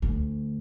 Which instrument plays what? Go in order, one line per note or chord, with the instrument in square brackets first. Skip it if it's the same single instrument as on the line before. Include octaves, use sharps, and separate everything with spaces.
[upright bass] D2